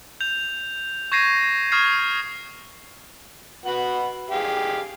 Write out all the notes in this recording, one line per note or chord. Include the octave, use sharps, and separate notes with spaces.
G6 F7
C#6 G6 G#6 A#6 C7 D#7
C#6 D#6 F6 G#6 C7
F#4 B4 F#5
G4 G#4 F5